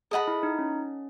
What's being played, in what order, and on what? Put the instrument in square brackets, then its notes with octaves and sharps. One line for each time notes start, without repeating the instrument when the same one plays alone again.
[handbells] G#4 [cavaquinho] A4 D#5 F#5 B5
[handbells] E4
D#4
C#4